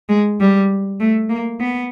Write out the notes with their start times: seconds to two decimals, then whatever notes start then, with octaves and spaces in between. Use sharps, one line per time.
0.09 G#3
0.40 G3
1.00 A3
1.29 A#3
1.60 B3